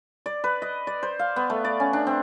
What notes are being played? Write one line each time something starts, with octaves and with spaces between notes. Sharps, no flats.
D5
B4
D#5
D5
C5
F5
B3
A3
D5
C#4
D4
C4